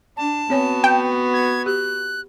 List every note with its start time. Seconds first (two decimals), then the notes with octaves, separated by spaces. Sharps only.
0.17 D4 A5
0.50 B3 C4 F#4 C#5 G#5
0.84 G5
1.34 G#6
1.66 G4 F#6